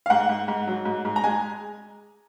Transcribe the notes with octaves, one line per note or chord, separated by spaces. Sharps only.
F5
G#2 F#5
G#2
G#2
F#3
G#2
G#2
A#5
G#3 G#5